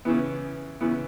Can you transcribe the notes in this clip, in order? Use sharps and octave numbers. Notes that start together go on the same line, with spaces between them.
C#3 E3 B3
C#3 E3 B3